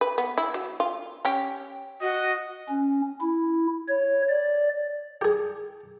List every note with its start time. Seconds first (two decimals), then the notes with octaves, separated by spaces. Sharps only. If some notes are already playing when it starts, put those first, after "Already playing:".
0.01 B4
0.18 B3
0.38 E4
0.54 F#3
0.80 F4
1.25 C#4 G4
2.01 F#4 D#5
2.69 C#4
3.21 E4
3.89 C#5
4.29 D5
5.21 G4 G#4